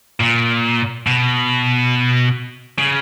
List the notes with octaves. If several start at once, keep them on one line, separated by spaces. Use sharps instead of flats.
A#2
B2
C#3